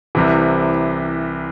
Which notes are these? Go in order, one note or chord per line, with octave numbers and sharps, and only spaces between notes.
C2 C3 E3